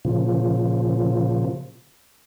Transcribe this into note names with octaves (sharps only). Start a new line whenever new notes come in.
A#2 C#3 F3